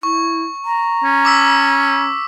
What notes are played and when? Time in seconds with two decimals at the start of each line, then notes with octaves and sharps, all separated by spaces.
0.03 E4 C#6
0.65 A#5
1.04 C#4
1.25 D6 E6 B6